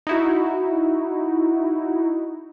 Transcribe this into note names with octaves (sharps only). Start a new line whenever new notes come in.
D#4 E4 F#4